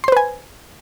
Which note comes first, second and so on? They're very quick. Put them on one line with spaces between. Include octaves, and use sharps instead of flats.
C6 C5 B4 G#5